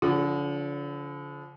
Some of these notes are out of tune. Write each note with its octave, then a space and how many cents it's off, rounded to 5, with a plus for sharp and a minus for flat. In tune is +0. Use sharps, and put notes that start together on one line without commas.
D3 -45 F3 +0 F#5 +0